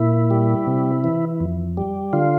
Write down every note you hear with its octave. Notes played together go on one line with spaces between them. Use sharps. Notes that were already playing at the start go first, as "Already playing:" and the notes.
Already playing: A#2 E4
G3
C3
E3
F2
G3
D3 F4